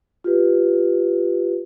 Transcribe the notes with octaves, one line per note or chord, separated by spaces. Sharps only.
F4 G4 B4